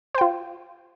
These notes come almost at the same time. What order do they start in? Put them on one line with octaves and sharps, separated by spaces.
C5 G5 F4